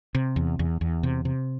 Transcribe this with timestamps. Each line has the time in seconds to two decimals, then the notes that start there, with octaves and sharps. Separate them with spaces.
0.15 C3
0.36 E2
0.59 E2
0.81 E2
1.03 C3
1.25 C3